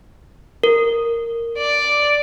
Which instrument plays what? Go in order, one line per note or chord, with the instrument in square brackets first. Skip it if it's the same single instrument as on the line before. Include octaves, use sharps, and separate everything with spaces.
[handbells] A#4
[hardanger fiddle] D5